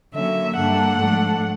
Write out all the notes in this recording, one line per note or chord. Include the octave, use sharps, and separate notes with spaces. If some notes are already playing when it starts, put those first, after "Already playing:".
D3 F#3 A#3 C#4 E5
G2 D3 G3 A#3 D4 F#5
G#2 F3 A3 D4